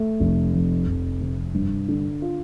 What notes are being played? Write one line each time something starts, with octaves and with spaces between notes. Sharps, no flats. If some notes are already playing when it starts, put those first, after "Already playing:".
Already playing: A3
F1
F2
F1
C3
G2
D3
F4